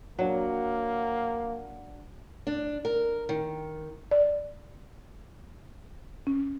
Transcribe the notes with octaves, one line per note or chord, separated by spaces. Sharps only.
F#3 A#3 D4 F#5
D4
A#4
D#3
D5
C#4